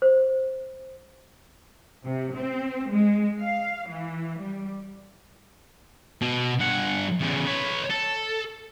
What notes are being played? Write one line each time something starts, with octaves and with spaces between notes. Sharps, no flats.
C5
C3
C4
G#3
F5
E3
G3
B2
G2 F#5
E2 C#3
B4 C#5
A4